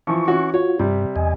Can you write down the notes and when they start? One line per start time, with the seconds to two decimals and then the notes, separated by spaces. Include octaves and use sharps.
0.07 E3 F3 C#6
0.28 E3 C#4 F#4
0.54 F4 F#4 C#5
0.79 G2 C3 G3
1.16 E2 D#5 G#5